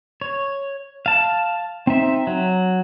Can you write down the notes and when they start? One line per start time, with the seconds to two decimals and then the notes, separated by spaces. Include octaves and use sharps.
0.22 C#5
1.06 F5 A5
1.87 C4 D#4 E5
2.27 F#3